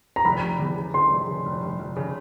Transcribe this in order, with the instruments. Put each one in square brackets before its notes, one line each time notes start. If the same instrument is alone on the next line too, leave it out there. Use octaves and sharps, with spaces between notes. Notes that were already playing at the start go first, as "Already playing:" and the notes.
[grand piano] A#5
[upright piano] F1 [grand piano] B5
[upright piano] F1
E2
C#3
[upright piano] C#3 [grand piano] C6
[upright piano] F1
C#3
F1
F1
F1
C#3